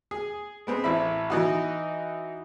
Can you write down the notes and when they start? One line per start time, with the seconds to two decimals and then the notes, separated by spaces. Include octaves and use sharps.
0.11 G#4
0.67 G#3 B3 C4
0.84 A1 E4 E5 B5
1.30 E3 D#4 F#4